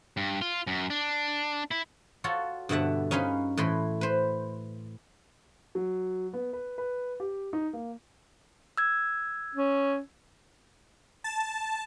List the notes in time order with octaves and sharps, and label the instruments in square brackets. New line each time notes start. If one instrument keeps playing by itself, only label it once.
[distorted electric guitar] G2
F4
F#2
D4
E4
[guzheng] F4 F#4 A4 C#5
G2 B2 D3 E5 F#5
C#4 D#4 B4 C#5 F5 C6
A2 E3 B4 C6
B4 C5
[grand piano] F#3
B3
B4
B4
G4
D#4
A#3
[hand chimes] E6 G#6
[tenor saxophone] C#4
[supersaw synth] A5